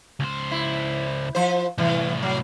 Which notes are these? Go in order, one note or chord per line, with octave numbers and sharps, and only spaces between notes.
C#2 C5
E4
F3 C5
C2 A2 E3
F#3